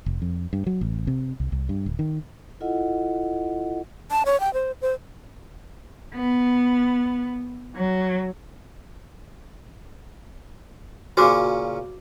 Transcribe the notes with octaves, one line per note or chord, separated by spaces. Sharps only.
F1
F2
G2
F#3
A1
C3
C2
C2
G2
D1
D#3
E4 F4 A4 D#5 F#5
A5
C#5
G5
C5
C5
B3
F#3
A#2 C#3 C#4 F#4 C5 D6